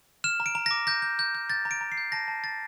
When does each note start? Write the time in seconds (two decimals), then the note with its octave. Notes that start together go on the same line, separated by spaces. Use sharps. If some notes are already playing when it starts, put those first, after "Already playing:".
0.24 F6 E7
0.40 A#5
0.46 D7
0.55 A#5
0.66 D6 A#6
0.87 G6 A#6
1.02 G6
1.19 G6
1.35 G6
1.50 G6 A6
1.65 A#5
1.71 D7
1.81 A#5
1.92 C7
1.97 G6
2.12 A5 A#6
2.28 A5
2.44 A5 A6